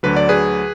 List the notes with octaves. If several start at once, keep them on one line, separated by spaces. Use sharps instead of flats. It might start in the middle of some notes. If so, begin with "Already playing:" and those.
D2 D3 F#3 B4
D5
G#4 B4